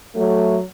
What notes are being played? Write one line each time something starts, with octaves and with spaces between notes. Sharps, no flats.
F#3 A3